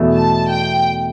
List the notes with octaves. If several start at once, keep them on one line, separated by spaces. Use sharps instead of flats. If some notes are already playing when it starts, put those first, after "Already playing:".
Already playing: E2 B2 A3
A5
G5